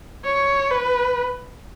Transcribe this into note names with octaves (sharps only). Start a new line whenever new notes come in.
C#5
B4